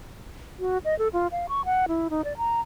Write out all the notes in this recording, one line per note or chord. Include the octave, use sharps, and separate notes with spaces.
F#4
D#5
A4
F4
F5
C#6
F#5
E4
D#4
D5
A#5